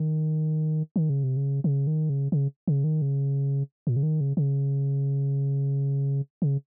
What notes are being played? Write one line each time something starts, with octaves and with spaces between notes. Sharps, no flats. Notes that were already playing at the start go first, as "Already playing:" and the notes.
Already playing: D#3
D#3
C#3
C3
C#3
C#3
D#3
C#3
C#3
C#3
D#3
C#3
A#2
C#3
D#3
C#3
C#3
C#3